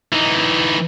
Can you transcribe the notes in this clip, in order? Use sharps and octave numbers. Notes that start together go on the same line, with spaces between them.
E3 D#4